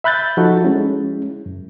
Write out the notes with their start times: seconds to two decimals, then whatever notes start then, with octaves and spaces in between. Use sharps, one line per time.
0.04 E5 B5 F#6 G6 A6
0.37 F3 D#4 F#4 A4
0.62 G#3 C#4 E4
1.46 F#2